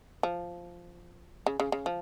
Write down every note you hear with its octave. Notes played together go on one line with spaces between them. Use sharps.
F3
C#3
C#3
C#3
F3